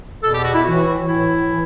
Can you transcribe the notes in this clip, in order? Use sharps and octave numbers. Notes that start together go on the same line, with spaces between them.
E2 B2 A4
G4
F#4
E4
A2 E3 F#4
A2 E3 E4
E3